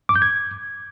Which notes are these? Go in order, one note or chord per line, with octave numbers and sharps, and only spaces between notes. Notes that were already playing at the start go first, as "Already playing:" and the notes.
D6
G6
G#6